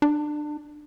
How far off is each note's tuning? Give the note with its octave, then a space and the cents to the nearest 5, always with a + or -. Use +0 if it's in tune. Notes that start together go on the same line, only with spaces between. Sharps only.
D4 +25